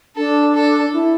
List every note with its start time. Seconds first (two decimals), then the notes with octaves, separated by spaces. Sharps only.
0.16 D4 A4
0.55 A4
0.93 E4